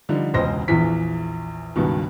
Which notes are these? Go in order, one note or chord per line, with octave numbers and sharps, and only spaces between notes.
D3 F3 G3 D#4
E1 C#2 C5 D#5 A#6
A#1 E2 E3 B6
C#2 G2 B2 D#3